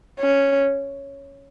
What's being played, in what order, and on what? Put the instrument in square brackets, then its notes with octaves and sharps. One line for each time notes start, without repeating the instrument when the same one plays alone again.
[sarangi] C#4